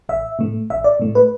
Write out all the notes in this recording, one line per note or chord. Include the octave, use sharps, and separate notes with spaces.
A1 E5
A2 A3
A1 E5
D5
A2 A3
B4